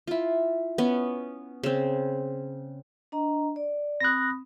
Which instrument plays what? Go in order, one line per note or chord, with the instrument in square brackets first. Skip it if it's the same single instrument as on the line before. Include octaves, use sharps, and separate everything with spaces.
[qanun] E4 F4
B3 C#4
C#3 C4
[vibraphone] D4 D#5 A#5
D5
[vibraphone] C4 B5 D#6 [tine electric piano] F#6 A#6